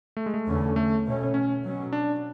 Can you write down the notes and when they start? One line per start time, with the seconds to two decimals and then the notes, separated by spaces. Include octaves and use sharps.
0.17 A3
0.26 G#3
0.34 A3
0.46 E2 D3 A3 C#4
0.76 A3
1.04 B2 A3 C#4
1.34 C#4
1.64 B2 F#3 C#4
1.93 D4